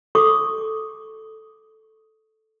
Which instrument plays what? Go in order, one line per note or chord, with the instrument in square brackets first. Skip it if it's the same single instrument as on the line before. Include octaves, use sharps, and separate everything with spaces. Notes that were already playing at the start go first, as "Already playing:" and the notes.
[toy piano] A4 C#6 D6